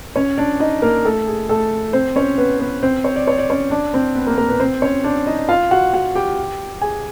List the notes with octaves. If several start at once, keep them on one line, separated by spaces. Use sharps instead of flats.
C#4 C#5
D4 D5
D#4 D#5
A#3 A#4
A3 A4
G#4
A3 A4
C4 C5
C#4 C#5
B3 B4
B3 B4
C4 C5
C#5
D5
C#5
D5
C#4 C#5
D4 D5
C4 C5
B3 B4
A#3 A#4
A#3 A#4
B3 B4
C4 C5
C#4 C#5
D4 D5
D#4 D#5
F4 F5
F#4 F#5
F#4 F#5
G4 G5
G#4 G#5